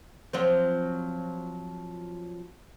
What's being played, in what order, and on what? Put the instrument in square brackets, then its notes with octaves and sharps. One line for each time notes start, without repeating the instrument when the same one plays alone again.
[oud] F3 F#3 C4